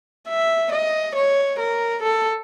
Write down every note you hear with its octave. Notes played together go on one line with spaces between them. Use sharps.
E5
D#5
C#5
A#4
A4